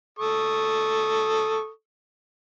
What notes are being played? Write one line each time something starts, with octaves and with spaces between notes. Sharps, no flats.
A4 C#6 D#6